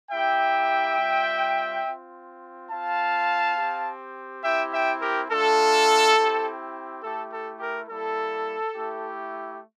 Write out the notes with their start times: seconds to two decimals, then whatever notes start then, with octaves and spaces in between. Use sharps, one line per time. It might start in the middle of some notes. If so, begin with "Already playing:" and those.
0.11 A#3 E4 G4 E5 G5
0.98 G3 C4 F4
1.84 C4 F4
2.70 C4 F4 F5 A5
3.56 C4 G4
4.43 C4 E4 G4 E5 G5
4.71 E5 G5
5.00 G4 A#4
5.29 A3 D4 F4 A4
6.15 C4 E4 G4
7.02 A3 E4 G4 A4
7.31 A4
7.60 G4 A#4
7.88 G3 A#3 E4 A4
8.75 A3 E4 G4